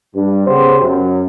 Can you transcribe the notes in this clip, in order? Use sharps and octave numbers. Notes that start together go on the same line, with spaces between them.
G2
C#3 B3 G4 C5
F#2